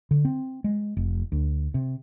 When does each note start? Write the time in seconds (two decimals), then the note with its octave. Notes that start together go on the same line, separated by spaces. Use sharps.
0.11 D3
0.25 C4
0.64 G#3
0.97 F1
1.32 D2
1.74 C3